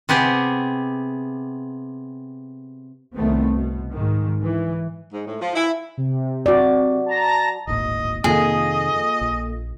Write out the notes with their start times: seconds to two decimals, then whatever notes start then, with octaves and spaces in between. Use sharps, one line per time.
0.09 C3 B3 G4 G#4
3.15 C2 D#3 A3 B3 C4
3.53 B2
3.91 G#2 D#3
4.41 E3
5.13 G#2
5.26 A2
5.41 F3
5.55 E4
5.97 C3
6.46 F#4 D5
7.06 A5 A#5 A#6
7.67 D1 G#1 A#2 D#5
8.24 F2 C3 D#3 A#3 F4 G#4 A4 D#5
9.21 A#1